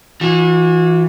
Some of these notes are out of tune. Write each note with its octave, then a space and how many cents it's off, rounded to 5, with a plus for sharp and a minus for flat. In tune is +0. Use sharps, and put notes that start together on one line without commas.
E3 +0 F#4 -40